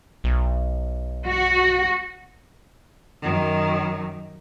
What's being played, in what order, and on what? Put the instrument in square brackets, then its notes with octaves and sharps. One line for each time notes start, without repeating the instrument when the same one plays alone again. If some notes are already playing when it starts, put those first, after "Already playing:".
[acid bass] B1
[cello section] F#4
[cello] F#2 D#3